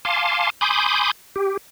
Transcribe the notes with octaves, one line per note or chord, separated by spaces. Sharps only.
F5 G#5 A5 C6 D6
G#5 B5 C6 D6 D#6 G6
G4